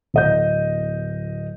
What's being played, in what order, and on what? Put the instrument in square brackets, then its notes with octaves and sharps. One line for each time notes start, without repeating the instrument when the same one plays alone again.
[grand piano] D1 D#5 G6